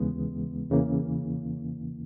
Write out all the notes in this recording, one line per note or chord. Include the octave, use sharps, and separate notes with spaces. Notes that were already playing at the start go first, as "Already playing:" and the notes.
Already playing: D#2 C#3 E3 G#3 B3
E2 C#3 E3 A#3